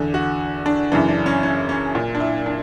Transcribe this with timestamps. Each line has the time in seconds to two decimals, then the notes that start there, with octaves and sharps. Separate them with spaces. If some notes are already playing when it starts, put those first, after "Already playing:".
Already playing: E2 D3
0.14 F#4
0.66 D4
0.92 F#2 C#3 E3 D4
1.08 D4
1.26 C#4
1.43 C#4
1.69 C#4
1.95 A#2
2.15 D4
2.20 E4
2.46 D4